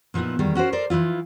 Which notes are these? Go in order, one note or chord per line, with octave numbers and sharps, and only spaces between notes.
A#2 F3 B3 D#4 E4
E2 D#3 G3
C#4 F#4 A#4 C5
A4 A#4 C5 D5
E3 F3 E4 F4